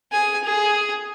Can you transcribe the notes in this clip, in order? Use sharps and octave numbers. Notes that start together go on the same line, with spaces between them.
G#4 G#5
G#4